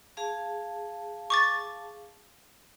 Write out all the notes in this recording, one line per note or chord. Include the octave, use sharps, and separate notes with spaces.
G#4 F5 A5
C#6 D6 A6